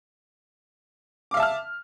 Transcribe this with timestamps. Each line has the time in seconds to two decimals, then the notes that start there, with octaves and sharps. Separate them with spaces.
1.31 D6
1.34 F5
1.37 E5
1.40 A5
1.43 F6